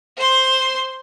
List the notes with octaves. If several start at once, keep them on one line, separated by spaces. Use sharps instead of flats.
C5 C6